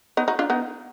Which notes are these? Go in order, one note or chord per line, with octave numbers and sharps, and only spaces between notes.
B3 D#4
D#4 F#4
D4 F4
B3 D#4